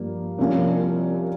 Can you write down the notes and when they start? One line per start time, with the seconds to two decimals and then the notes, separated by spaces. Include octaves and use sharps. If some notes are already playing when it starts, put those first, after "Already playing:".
Already playing: G2 F3 A#3
0.38 C2 C3 F3 A#3 C#4